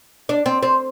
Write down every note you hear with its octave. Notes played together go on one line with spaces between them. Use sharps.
D4
C4
C4